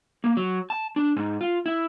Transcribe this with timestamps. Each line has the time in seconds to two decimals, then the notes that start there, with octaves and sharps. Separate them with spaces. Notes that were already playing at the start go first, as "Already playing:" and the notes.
0.24 A#3
0.37 F#3
0.70 A5
0.96 D4
1.16 G#2
1.41 F4
1.66 E4